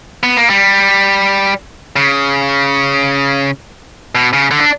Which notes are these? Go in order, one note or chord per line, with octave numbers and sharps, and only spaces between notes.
B3
A#3
G3
C#3
B2
C#3
D3
D4